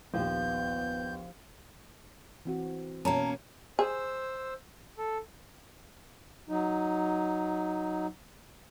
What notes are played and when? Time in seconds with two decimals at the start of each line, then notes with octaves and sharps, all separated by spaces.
0.14 A#1 D#2 F3 B3 G6
2.45 E3 C4 F#4
3.05 B2 A#3 C#4 A#4 A5 A#5
3.79 G#4 C5 E6
4.98 A4
6.49 F#3 D#4